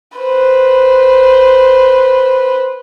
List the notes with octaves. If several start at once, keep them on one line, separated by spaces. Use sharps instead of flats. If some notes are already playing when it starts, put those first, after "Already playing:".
B4 C5